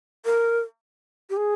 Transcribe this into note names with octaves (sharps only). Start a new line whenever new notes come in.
A#4
G4
G#4